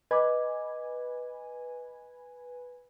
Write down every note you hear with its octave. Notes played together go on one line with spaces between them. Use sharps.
B4 D#5 G#5 D6